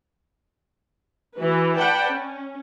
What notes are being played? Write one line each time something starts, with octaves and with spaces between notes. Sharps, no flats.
E3 F#4 B4
B4 D5 F#5 G5 A5 B5
C#4